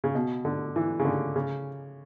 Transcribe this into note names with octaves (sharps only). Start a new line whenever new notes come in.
C#3
B2
D3
E3
C#3
D3
C#3